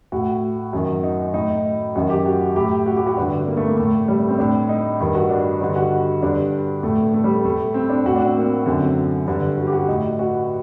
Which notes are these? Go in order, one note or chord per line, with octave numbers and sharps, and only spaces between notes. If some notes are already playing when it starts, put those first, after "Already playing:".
A2 F#4
F#2 D#3
D#4
A2 D#4
F#2 D#3 F#4
G4
F#4
A2 G4
F#4
G4
F#4
G2 D3 D4
A#3
A3
A#3
A2 A3
G3
A3
C4
A2 D4
D#4
G2 D#3 D#4
F#4
D4
G2 D3 D#4
F#4
G2 D3 D4
A2 A3
A3
G3
A3
A2 A3
C4
D4
A2 F#4
D4
C4
A#3
F#2 D3 C4
G2 D3
F#4
G4
F#4
A2 D#4
F#4